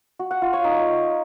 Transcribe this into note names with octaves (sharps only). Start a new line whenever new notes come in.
F#4
F#5
F4
C#5
D#4